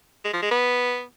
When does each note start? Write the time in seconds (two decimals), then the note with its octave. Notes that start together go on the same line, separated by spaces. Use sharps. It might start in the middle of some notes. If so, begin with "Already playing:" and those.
0.25 G#3
0.34 F3
0.42 G#3
0.51 B3